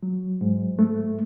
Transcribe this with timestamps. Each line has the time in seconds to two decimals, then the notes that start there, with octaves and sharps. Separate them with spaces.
0.03 F#3
0.41 G#2
0.79 A3